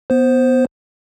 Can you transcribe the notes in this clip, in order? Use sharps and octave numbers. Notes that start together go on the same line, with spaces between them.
B3 C5